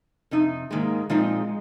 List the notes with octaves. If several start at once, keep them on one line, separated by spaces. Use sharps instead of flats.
F2 C3 D#4
G#2 D#3 G#3 A#3
A#2 F3 G#3 C4 D#4